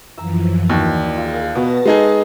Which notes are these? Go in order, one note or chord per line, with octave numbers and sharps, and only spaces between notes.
F#2 E3 F3 A#5 E6
D#2 E3 F#4 D5 C#6
F4 G#4 A#4 E6
B2 B3 F#4 A5 A6 A#6
G#3 D#4 G#4 A4 D#5 G5